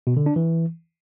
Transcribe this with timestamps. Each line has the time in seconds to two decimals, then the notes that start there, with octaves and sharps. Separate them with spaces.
0.07 B2
0.17 D3
0.26 D4
0.36 E3